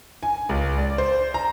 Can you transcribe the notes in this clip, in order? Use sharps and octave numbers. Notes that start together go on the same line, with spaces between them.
G#5
C#2
D5
C5
A#5